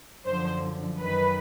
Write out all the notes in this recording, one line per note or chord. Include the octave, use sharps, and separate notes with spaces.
F#2 D3 F3 C5
F#2 D#3 B4